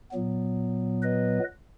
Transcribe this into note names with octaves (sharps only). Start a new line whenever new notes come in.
A#2 F#3 B3
B4 D#5